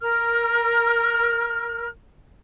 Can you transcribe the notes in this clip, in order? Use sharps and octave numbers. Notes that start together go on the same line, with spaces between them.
A#4 F6